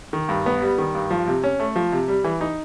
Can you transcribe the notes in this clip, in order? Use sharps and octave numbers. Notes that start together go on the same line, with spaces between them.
D#3
G2
B3
G3
D#3
G2
F3
C3
C#4
A3
F3
C3
G3
E3
D#4